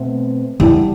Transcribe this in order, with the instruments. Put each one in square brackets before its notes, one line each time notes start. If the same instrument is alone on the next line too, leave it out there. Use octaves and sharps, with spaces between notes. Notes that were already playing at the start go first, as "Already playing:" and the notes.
Already playing: [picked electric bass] B2 A3 C4
[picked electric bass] D3 G3 D4 [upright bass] E3